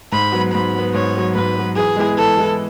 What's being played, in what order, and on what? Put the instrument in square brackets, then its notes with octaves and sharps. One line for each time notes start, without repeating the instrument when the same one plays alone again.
[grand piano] G#2 [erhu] B5
[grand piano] F#3 B3
[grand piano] G#2 [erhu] B5
[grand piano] F#3 B3
[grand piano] G#2 [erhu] C#5
[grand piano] F#3 B3
[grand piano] G#2 [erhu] B4
[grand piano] F#3 B3
[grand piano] E3 [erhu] G#4
[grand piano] G#3 B3 E4
[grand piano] E3 [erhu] A4
[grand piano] G#3 B3 E4